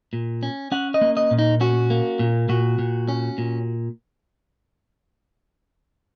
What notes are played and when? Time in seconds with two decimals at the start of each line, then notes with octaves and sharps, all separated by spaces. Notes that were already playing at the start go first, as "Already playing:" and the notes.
0.13 A#2
0.43 C#4
0.72 C#4 F#5
0.94 D#5
1.01 A#3
1.17 D#5
1.31 A#2
1.39 D#4
1.61 C#4 F#4
1.90 A#3
2.19 A#2
2.49 A#2 F#4
2.79 A#2
3.08 C#4
3.38 A#2